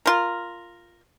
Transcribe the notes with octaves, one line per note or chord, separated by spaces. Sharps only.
F4 A#4